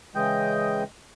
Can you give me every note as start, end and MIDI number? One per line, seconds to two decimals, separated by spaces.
0.15 0.83 49
0.15 0.83 52
0.15 0.83 56
0.15 0.83 75
0.15 0.83 79
0.15 0.83 91